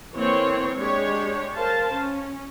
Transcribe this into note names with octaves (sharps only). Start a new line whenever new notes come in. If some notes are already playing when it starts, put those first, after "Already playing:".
E3 A#3 C4 C#5
G#3 D4 G4 C#5
A#4 C5 F5 A5
C#4